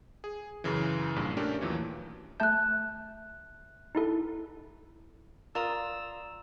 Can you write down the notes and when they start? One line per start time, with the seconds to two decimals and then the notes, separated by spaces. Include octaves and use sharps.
0.24 G#4
0.64 F#2 C#3 E3
1.16 A#1 G2 A#2
1.37 A3 C#4 D4 G4 A4 A#4
1.61 D#2 A#2 E3 F#3
2.40 A3 E5 A5 F#6 G6
3.95 D#4 E4 A4
5.55 F4 A#4 D5 A#5 D#6 E6